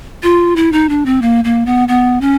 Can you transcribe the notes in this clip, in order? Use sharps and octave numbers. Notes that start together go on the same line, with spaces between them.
F4
E4
D#4
D4
C4
A#3
A#3
B3
B3
C#4